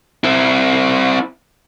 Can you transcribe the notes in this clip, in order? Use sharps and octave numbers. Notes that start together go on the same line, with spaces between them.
C4 E4